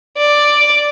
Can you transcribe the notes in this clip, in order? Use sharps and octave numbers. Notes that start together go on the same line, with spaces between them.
D5